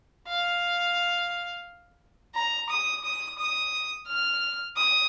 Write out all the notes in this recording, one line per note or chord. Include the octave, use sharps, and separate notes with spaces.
F5
A#5
D#6
D#6
D#6
F6
D#6